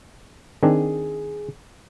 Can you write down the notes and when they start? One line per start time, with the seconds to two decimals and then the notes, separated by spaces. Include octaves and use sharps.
0.63 D#3 C4 D4 G#4